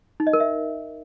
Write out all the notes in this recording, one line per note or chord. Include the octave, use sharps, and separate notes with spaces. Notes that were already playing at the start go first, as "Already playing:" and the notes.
D#4
D#5
A#4
E5